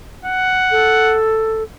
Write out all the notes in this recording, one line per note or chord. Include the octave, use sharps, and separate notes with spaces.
F#5
A4